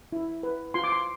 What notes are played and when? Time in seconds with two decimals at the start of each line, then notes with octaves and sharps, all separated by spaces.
0.12 E4
0.43 B4
0.74 F4 C6
0.84 D6
0.92 C6